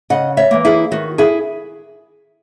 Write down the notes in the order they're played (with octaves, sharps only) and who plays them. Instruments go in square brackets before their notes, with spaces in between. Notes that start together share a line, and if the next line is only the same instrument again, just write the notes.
[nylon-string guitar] C#3 D#5 F#5
C#5 E5
E3 A#3
E4 G#4
D#3 F#4
E4 G#4